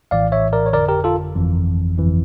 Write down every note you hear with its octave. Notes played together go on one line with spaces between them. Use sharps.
A#1 A2 E3 D5 F5
C#5 E5
A#4 D5
C#5
G1 F2 D3 A#4 D5
G4 A#4
F4 A4
G1 F2 E3
G1 F2 E3